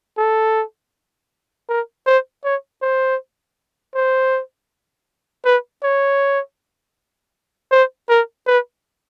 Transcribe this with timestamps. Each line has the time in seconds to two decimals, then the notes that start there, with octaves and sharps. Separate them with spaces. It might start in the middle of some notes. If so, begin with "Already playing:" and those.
0.17 A4
1.69 A#4
2.06 C5
2.44 C#5
2.82 C5
3.95 C5
5.45 B4
5.83 C#5
7.72 C5
8.09 A#4
8.47 B4